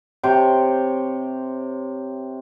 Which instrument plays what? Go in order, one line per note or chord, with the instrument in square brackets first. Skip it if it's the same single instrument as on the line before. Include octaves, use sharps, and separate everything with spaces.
[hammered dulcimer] C3 C5 C#5 G5